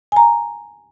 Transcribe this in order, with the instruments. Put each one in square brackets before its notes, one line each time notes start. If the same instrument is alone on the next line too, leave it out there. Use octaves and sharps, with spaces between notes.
[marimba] G#5 A#5